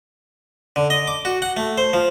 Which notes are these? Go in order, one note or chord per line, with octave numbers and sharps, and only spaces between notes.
D3
D#5
D6
F#4
F#5
A3
C5
F3